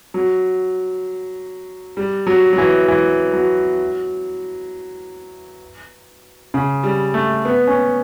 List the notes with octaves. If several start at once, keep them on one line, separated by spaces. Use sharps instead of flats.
F#3
G3
F#3
F#3
E3
E3
F#3
C#3
G3
A3
B3
C#4